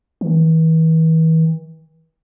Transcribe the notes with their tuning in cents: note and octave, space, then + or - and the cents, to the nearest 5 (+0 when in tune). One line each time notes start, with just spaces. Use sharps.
E3 -40